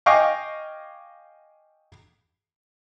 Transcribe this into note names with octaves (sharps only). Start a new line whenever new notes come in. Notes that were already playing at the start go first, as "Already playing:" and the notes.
D#5 F5 G5 G#5 C#6 D6